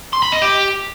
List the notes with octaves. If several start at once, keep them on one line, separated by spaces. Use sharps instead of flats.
C6
B5
D#5
G4